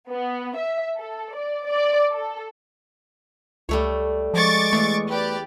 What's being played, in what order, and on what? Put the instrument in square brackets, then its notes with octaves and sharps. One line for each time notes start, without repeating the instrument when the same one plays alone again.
[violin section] B3
E5
A4
D5
D5
A4
[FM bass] C#2 [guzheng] G3 A3 C#5
[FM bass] F3 [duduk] G#3 [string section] C#6 D6 A6
[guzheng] E2 [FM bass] A3
[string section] G4 D5 [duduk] B4